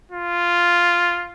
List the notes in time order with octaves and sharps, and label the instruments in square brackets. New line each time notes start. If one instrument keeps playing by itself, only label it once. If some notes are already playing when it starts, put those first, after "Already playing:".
[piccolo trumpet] F4